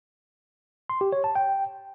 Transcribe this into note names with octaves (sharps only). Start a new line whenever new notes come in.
C6
G4
C#5
A5
G5